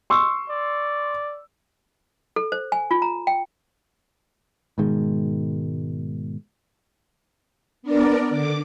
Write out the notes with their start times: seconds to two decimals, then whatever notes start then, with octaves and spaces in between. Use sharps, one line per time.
0.10 C6 C#6 E6
0.49 D5
2.36 A4
2.52 C5
2.72 G#5
2.91 F4
3.02 A#5
3.27 G5
4.78 G#2 B2 D#3 G#3
7.82 B3 D4 A#4 D5
8.30 D3 D6